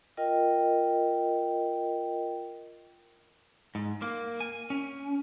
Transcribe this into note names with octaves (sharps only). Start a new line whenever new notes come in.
F4 A#4 D#5 G5
G#2
A#3
G#5
C#4